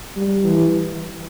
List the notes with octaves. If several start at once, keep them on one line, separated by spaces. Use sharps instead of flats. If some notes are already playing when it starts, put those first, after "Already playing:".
G3
E3